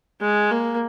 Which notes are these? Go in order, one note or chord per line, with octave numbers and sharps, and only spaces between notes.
G#3
A#3